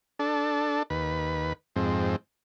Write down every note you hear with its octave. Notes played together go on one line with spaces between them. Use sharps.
D4 A4
D#2 B4
F2 G#2 C4